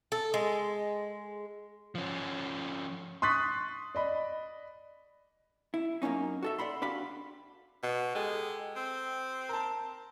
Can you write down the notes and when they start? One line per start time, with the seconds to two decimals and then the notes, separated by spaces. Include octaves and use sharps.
0.12 A4
0.34 G#3
1.95 F3 C#4
3.22 C6 C#6 D#6 F#6 A6 B6
3.95 D5 D#5 B5
5.74 E4
6.02 F#2 A#3 C4 C#4 D#4
6.43 F#4 A4 E5
6.59 D5 F#5 B5 C6
6.82 D4 F#4 G4 F5 B5
7.83 B2
8.15 G#3 G4 A4
8.76 C4
9.49 A#4 A5